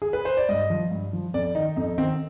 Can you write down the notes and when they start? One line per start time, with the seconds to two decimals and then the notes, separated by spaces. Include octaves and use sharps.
0.02 G#4
0.13 B4
0.25 C5
0.37 D5
0.49 G2 D#5
0.70 F3
0.91 G2
1.13 F3
1.34 F2 D5
1.55 D#3 D#4
1.76 F2 D#4
1.98 D#3 C4